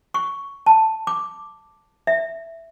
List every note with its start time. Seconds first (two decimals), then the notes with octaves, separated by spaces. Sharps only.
0.14 C#6
0.66 A5
1.07 D6
2.07 E5